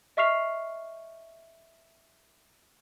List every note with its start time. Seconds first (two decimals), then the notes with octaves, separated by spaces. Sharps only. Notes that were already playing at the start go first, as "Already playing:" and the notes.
0.17 D#5 E5 C#6 F6 C7 F7